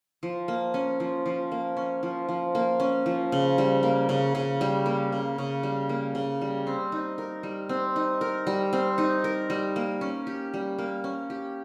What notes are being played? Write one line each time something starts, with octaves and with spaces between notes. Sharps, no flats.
F3
A#3
C#4
F3
F3
A#3
C#4
F3
F3
A#3
C#4
F3
C#3
G3
A#3
C#3
C#3
G3
A#3
C#3
C#3
G3
A#3
C#3
G3
C4
D#4
A#4
G3
C4
D#4
A#4
G3
C4
D#4
A#4
G3
A#3
C#4
G4
G3
A#3
C#4
G4